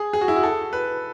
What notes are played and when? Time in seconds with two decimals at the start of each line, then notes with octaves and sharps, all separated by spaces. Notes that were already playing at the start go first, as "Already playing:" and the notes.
Already playing: G#4
0.13 G#4
0.21 F#4
0.28 E4
0.36 F#4
0.43 A4
0.73 B4